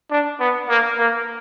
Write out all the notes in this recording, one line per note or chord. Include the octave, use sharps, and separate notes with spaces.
D4
B3
A#3
A#3